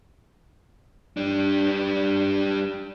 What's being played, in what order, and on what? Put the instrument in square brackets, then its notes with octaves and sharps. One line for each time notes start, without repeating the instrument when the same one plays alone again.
[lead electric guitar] G3 D4